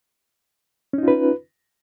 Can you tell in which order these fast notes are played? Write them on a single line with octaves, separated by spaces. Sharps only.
C#4 D#4 F4 B4